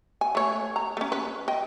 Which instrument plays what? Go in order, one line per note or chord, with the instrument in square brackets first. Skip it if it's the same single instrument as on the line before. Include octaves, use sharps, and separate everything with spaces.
[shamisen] G#5
A3 C#5
A#5
A3 C#4
B4
D#5 G5